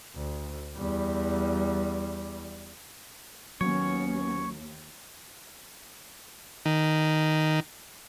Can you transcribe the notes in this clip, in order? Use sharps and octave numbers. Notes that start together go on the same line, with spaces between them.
D2
E2 G3
D#2 F#3 B3 C#4 C#5
D#3